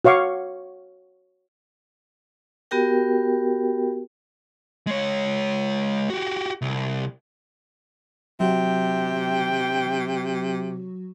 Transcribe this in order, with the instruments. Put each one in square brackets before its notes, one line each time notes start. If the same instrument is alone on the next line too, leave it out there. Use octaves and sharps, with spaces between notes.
[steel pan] F#4 C#5 F5 C#6 D6
[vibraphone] B3 F#4 G4 A#4 G5
[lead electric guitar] G#3 C#5
F#4 G4
C2
[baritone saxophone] C3 [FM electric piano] F#3 F#4 [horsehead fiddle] G5